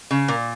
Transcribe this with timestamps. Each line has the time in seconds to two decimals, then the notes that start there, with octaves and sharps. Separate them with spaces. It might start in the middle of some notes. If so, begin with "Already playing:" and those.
0.11 C#3
0.28 A#2 A#4